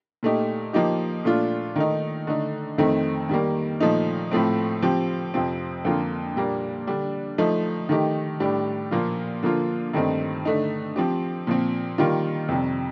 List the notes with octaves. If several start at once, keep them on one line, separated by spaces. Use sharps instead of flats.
A#2 A3 D#4 G4
F3 A#3 D#4 G4
A#2 A3 D4 F4
D#3 A3 D#4
D3 A3 D#4
F2 D#3 A3 C4 D#4
D#3 G3 A#3
A#2 F3 A3 D#4
A2 F3 A3 C4
F3 C4 G4
F2 C3 F3 C4
F2 D3 F3 A#3 F4
A#2 G3 A#3 D4
D3 G3 D4
F3 A3 D#4
D#3 A3 D#4 G4
A2 G3 D4 G4
A#2 F3 A#3 F4
D3 F3 A#3 F4
G2 D#3 A3 C4 D#4
D3 A3 D#4
F3 C4 G4
A#2 F3 C4
D#3 G3 A#3 F4
F2 C3 G3